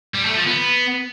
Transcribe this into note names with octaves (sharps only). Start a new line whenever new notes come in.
G3
A3
F3
B3